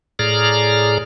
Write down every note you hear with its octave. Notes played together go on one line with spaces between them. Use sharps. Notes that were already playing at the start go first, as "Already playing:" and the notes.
A2 G#4 D5 A#5 F6